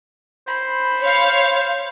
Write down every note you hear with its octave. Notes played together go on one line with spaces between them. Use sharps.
C5 B5
C#5 F5